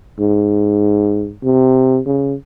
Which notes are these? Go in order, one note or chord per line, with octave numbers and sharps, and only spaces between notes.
G#2
C3
C#3